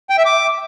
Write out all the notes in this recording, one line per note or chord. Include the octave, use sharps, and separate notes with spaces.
G5
E5
D6